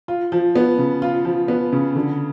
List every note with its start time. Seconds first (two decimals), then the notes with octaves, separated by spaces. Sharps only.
0.08 F4
0.32 F3
0.56 B3
0.78 C#3
1.02 F4
1.25 F3
1.48 B3
1.73 C#3
1.95 D3